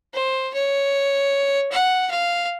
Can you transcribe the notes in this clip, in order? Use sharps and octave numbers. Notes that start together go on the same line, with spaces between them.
C5
C#5
F#5
F5